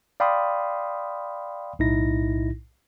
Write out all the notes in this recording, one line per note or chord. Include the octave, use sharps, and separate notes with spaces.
D5 F5 G5 B5 C6 D#6
B1 A2 D#4 E4 A#6